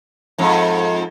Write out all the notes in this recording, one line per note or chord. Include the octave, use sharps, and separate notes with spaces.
F2 G#2